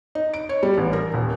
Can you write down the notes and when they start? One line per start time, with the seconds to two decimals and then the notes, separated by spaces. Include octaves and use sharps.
0.15 D#4
0.34 D7
0.49 C#5
0.63 G3
0.77 A1
0.93 A#4
1.14 D#1